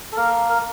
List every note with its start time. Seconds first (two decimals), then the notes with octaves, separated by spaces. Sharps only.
0.12 A4
0.16 A#3 A#4
0.50 A#4